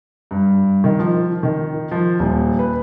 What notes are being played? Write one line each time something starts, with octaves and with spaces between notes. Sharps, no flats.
G2
D#3
F3
D#3
F3
D#1
B4